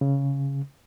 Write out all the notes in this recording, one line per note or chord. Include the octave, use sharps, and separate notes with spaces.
C#3